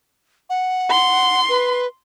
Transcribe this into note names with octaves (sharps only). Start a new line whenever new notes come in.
F#5
C6
B4